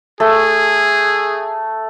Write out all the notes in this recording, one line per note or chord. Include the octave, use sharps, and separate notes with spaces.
A3 G#4